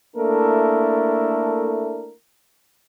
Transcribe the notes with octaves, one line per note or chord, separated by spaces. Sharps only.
A3 A#3 D4 E4 A4 A#4